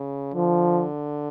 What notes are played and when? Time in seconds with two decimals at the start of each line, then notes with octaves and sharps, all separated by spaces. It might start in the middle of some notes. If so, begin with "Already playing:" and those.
Already playing: C#3
0.34 D3 F3